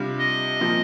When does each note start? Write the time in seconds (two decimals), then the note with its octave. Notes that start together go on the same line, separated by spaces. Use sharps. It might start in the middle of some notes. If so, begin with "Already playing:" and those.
Already playing: C3 G3 D4 F4
0.19 D#5
0.60 A#2 F3 C4 D#4